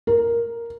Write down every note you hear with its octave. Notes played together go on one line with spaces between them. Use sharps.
A#4